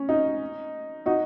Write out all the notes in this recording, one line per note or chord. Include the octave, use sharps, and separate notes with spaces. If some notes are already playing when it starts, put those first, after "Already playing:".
Already playing: C#4
D#4
D#4 F#4